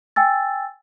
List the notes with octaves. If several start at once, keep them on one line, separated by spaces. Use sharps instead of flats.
G5 G#5 E6 A6